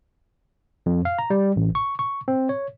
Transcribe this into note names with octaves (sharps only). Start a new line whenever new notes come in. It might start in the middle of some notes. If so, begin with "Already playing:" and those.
F2
F5
A#5
G3
A1
C#6
C#6
C4
C#5